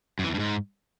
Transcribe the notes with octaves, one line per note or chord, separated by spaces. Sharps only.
F#2
E3
E2
G2
G#2